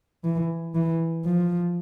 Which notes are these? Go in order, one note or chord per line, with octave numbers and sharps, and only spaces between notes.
E3
E3
F3